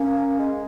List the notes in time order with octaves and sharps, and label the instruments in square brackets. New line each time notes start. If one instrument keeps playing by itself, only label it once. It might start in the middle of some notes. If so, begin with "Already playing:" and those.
Already playing: [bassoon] A#3 [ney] C#4
[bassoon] G#3